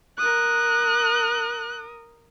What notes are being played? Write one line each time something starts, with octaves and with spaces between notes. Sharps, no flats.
A#4 D#6 F#6